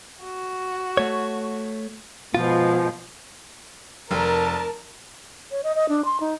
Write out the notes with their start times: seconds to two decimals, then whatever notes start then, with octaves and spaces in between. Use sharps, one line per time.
0.22 F#4
0.97 A3 C#5
2.35 B2 F3 G#3 F4
4.11 F1 A#4 A5
5.51 C#5
5.64 D#5
5.75 D#5
5.89 D4
6.05 C6
6.20 D#4